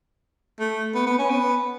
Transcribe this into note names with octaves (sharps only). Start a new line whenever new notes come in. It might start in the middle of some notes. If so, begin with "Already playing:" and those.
A3
B3
B3
C#4
B3